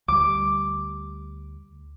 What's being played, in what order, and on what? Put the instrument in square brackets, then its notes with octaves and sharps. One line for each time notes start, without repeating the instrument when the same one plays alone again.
[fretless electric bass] D2 G3 [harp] D6